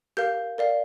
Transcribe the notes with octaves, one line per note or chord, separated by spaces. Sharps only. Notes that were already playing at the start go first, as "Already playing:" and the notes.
G4 A#4 F5 G6
A#4 D5 F5